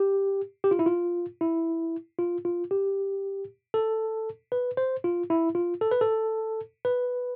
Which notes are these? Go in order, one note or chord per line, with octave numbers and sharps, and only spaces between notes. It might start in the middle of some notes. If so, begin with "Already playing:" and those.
Already playing: G4
G4
F4
E4
F4
E4
F4
F4
G4
A4
B4
C5
F4
E4
F4
A4
B4
A4
B4